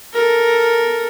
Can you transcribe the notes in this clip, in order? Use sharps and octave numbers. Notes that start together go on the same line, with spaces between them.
A4 A#4